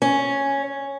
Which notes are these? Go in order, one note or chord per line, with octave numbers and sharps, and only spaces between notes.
C#4